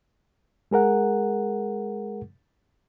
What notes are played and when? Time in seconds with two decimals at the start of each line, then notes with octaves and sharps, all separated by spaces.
0.71 G#3 G#4 A#4 F#5